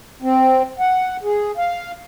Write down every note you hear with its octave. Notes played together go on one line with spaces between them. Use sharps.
C4
F#5
G#4
F5